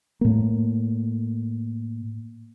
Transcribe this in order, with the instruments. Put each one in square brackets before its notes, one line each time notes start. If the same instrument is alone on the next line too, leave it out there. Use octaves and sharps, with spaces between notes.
[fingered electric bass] A2 A#3